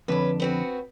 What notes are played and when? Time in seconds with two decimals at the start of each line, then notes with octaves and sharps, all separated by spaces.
0.08 F2 D3 C#4 D4 B4
0.40 B3 C4 F#4